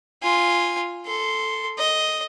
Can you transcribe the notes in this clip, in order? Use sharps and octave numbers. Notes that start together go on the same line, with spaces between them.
F4 G#5
A4 C6
D#5